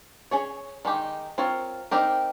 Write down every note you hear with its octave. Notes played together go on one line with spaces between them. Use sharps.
C#4 G#4 C#5
D#3 G#3 D#4 G4
C4 F4 A#4 C#5
C4 D#4 G4 A#4